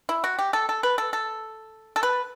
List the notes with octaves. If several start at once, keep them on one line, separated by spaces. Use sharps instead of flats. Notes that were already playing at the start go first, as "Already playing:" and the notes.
E4
F#4
G4
A4
A4
B4
A4
A4
A4
B4